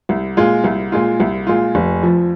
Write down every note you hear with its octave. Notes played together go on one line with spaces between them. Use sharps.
C2
A#2 G#3 F4
C2
A#2 G#3 F4
C2
A#2 G#3 F4
F1
F2 F3